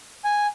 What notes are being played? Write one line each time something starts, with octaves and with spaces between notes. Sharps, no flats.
G#5